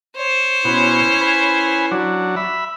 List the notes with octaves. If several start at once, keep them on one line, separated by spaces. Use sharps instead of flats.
C5 C#5
B2 C#4 E4
B4 G#5
F#3 D4
E5 B5